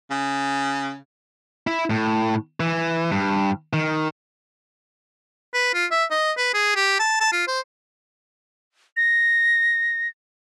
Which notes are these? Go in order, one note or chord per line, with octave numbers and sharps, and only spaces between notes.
C#3
E4
A2
E3
G2
D#3
B4
F4
E5
D#5
B4
G#4
G4
A5
A5
F4
C5
A#6